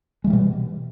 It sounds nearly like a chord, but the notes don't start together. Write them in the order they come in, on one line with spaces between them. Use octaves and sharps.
G#3 E3 G3 B2